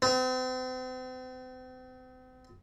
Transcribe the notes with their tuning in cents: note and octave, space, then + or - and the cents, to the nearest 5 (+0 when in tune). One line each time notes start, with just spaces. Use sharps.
C4 -40